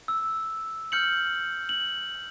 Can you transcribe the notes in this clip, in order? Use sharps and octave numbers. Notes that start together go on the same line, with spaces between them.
E6
F6 G6 C#7 F#7
F#7